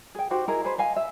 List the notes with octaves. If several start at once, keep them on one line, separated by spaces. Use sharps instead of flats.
G#4 G5
D#4 F#4 G4 C5
E4 G#4 A#4 D#5
G#4 B4 C5
D#5 F5 G#5
E5